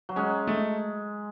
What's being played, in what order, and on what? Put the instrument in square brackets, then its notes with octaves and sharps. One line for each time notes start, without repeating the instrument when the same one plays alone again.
[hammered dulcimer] F#3
[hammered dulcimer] G#3 [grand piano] C#4
[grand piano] A3